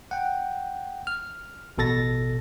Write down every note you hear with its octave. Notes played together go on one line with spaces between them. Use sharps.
F#5 G5
F6
A1 B2 A4 A6 A#6